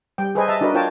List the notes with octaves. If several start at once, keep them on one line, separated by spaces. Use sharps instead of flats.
G3 G5
G#4 A4 B4 C5 D#5 G#5
D#5 E5 A5 A#5
D4 D#4 F#4 A#4 B4 D#5
D4 F4 A#4 C#5 G5 A5